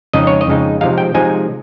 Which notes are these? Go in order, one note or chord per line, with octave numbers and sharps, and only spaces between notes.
F2 C#3 G#3 D#4 D#5
C#5
D#5
F2 C#3 G#3 D#4
C3 F3 G#3 D#4 F5
G5
C3 F3 G#3 D#4 G#5